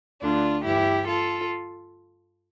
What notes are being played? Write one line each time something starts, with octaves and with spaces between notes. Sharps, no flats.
D2 D3 D4 F4
G2 E3 E4 G4
F4 A4